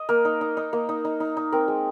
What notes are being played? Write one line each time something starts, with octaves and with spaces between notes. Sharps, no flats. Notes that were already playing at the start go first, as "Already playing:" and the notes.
Already playing: D#5
A#3 A#4
D#4
D#4
D#4
A#3
D#4
D#4
D#4
D#4
C4 A#4
G#3